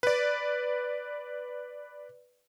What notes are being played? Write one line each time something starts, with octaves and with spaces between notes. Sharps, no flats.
B4 D5